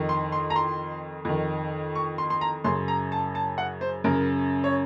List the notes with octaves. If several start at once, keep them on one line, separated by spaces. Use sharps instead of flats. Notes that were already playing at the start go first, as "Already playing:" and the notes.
Already playing: F2 D#3
C6
C6
A#5
C6
F2 D#3
C#6
C6
C6
A#5
F#2 C#3 C6
A#5
A5
A5
F#5
C5
F#2 C#3 A#4
C#5